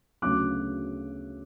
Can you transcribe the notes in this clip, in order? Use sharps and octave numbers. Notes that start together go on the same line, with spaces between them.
D2 C#3 F#3 B3 D6 F#6